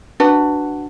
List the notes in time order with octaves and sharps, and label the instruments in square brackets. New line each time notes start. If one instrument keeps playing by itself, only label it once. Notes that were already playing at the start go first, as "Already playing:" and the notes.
[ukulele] D4 F#4 B4 F#5